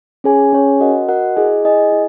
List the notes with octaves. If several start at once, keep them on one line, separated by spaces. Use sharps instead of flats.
C#4 G#4 C#5 G#5
C#4 G#4 C#5 G#5
F#4 A#4 D#5 F#5
F#4 A#4 D#5 F#5
E4 G#4 D#5 G#5
E4 G#4 D#5 G#5
E4